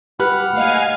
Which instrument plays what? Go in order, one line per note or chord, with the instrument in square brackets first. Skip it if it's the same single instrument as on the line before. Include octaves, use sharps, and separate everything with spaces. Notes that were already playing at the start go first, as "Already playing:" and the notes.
[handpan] G4 [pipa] B4 [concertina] F#5 B5 F6
[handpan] A3 A#3 D#5 [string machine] F5 G#5